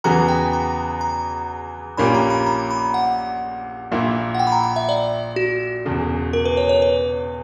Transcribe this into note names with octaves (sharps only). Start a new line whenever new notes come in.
E2 C#3 E3 B3 F#4 A#5
G5
A#5
A#5
A#1 A#2 A#3 C#4 G4 B5
A#5
B5
A#5
B5
F#5
A#1 A#2 A#3 E4
F#5
G5
B5
A#5
G5
E5
D5
F#4
E1 E2 C#3
A#4
B4
C#5
C#5
B4